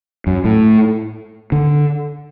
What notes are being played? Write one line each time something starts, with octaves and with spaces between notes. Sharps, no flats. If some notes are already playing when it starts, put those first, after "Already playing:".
F#2
A2
D3